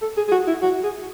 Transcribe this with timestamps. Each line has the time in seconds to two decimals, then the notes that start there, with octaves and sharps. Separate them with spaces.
0.02 A4
0.17 G#4
0.28 G#4
0.32 F#4
0.47 E4
0.62 F#4
0.83 G#4